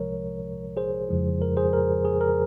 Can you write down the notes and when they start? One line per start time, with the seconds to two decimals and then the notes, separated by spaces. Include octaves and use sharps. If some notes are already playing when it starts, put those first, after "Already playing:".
Already playing: C2 C3 F3 G#3 A#4 C#5
0.77 G#4 C5
1.09 F2 C#3 F3 G#3 E4
1.42 A#4
1.57 G#4 C5
1.73 A#4
2.05 G#4
2.21 A#4